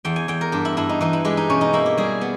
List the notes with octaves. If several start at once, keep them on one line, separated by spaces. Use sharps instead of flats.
E2 G5
G#5
E2 G5
A#4
G2 G4
E4
G2 E4
D#4
E3 D#4
E4
G#3 G4
D#4
B2 C#4
D#4
A#3 E4
G4
G3 G#4
B3